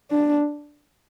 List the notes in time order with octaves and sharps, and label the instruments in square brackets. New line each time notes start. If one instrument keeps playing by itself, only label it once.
[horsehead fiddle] D4